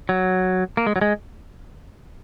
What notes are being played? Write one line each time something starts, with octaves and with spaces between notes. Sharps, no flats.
F#3
A#3
G#3
F#3
G#3